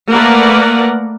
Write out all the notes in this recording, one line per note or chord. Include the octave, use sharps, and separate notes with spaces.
A3 A#3 A#4 B4 D5 F#5